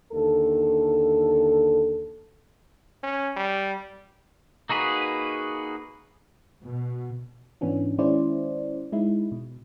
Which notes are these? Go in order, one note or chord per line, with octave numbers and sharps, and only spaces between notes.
D#2 D3 A4
C#4
G3
A#3 D#4 F#4 G#4 B4
B2
G#2 E3 B3 C#4 D4
D#3 G#3 C#4 E4 C5 D5
G#3 D#4 E4
B2